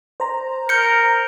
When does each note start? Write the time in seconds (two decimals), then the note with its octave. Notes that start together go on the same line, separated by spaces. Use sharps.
0.20 C5 A#5
0.69 A#4 G6 C#7